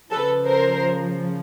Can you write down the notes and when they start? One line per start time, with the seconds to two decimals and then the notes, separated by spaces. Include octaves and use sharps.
0.11 C#3 F3 A4 B4
0.46 A#4 C5